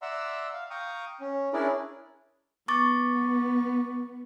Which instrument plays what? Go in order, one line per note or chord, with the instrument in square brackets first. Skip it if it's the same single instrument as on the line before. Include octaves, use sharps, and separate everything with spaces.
[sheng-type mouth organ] D5 E5 F#5 A#5 C6 E6
F5
F5 G5 A#5 C#6 D#6
C#4
C#4 D4 E4 G#4 A#4 D5
[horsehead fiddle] B3 [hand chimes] C#6 D6 A6